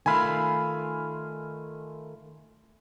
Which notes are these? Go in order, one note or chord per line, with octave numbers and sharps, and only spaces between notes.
D#3 A3 F4 G#5 B5